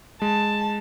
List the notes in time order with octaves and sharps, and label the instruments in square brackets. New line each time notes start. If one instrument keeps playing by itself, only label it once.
[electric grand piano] G#3 [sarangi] A5